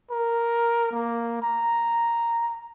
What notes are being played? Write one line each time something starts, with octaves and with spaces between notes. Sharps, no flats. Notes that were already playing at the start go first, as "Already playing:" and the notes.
A#4
A#3
A#5